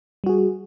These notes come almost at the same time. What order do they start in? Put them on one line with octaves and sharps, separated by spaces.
G3 F#4 G#4